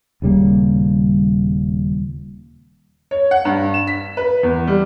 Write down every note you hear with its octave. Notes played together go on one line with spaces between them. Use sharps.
D#1 C#3 G3 A#3
C#5
F#5
G2
E7
B6
B4
E2
G3